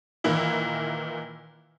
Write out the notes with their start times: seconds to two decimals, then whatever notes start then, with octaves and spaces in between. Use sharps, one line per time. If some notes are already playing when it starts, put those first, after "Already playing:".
0.24 A#2 D#3 E3 A#3 E4